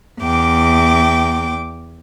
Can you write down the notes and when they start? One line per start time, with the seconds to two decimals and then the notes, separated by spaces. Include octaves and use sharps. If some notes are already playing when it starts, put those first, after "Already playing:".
0.20 E2 G5 D6